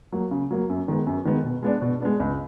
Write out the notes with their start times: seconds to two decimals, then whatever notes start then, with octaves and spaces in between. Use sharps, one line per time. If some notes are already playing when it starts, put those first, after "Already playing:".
0.12 F#3 A#3
0.31 C#3
0.51 F#3 A#3
0.70 F#2
0.88 D#3 G#3 B3
1.07 F#2
1.25 D#3 G#3 B3
1.44 B2
1.63 G#3 B3 D4
1.82 B2
2.00 G#3 B3 D4
2.20 C#2